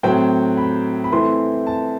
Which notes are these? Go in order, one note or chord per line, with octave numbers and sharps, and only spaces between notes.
A2 F#3 C4 G5
B5
B5
E3 A3 C4 E4 C6
A5